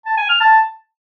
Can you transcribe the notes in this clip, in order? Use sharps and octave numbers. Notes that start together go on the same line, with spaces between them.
A5
G#5
F6
A5